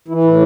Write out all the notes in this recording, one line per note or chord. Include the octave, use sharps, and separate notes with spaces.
E3 E4
A2 E4